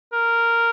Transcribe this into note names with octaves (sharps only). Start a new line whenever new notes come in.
A#4